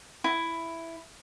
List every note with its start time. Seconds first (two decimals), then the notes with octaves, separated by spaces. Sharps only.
0.24 E4